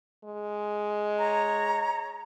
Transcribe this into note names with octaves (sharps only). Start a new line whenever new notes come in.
G#3
C#5 A#5